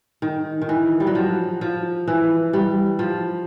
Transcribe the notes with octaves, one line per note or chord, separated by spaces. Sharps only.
D#3
D#3
E3
G3
F#3
F3
F3
E3
G3
F3